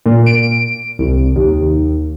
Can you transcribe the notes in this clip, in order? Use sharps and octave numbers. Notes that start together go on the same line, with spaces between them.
A#2
D7
C2
D#2